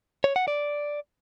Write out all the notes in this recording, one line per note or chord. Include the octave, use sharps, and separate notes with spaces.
C#5
F#5
D5